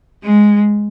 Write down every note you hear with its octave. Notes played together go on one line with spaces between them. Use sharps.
G#3